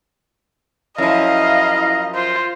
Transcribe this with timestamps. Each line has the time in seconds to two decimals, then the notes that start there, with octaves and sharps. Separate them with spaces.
0.98 F#2 F3 E4 D#5 F5 A#5
2.15 F4 C5